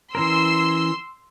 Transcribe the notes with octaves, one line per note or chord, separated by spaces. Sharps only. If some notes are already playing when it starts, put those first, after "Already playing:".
E3 C#4 A#4 C6 E6